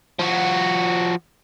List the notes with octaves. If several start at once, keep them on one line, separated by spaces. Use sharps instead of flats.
F3 F#4